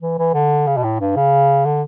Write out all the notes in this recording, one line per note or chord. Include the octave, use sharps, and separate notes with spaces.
E3
E3
D3
C#3
B2
A2
G2
C#3
D3